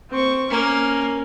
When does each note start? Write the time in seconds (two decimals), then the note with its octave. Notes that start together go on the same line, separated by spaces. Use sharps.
0.10 C4 C#6
0.50 A#3 C#4 A#4